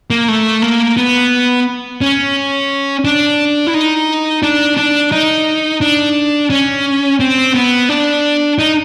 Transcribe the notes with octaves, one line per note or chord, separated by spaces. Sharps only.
A#3
A3
A#3
B3
C#4
D4
E4
D#4
D4
D4
D#4
D4
C#4
C4
B3
D4
D#4